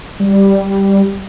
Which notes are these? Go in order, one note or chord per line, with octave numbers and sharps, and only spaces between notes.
G3